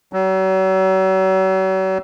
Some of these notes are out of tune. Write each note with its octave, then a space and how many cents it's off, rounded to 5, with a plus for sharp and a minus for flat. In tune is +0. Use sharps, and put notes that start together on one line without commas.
F#3 +40